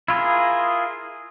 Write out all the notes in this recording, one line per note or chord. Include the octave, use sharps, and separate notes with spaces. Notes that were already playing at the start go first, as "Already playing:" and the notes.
E4 F4 G#4 A#4